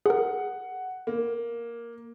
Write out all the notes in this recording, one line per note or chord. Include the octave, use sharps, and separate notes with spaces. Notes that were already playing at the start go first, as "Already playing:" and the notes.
G#4 A#4 F#5
A#3